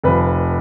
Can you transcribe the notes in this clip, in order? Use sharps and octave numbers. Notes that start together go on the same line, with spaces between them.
F1 F3 B4